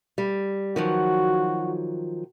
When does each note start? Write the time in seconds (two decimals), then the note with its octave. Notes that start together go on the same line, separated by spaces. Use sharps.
0.18 G3
0.76 D#3 F3 F#3 F#4